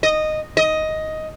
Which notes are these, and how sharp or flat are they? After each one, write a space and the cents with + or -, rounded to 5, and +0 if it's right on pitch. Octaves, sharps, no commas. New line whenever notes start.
D#5 -10
D#5 +10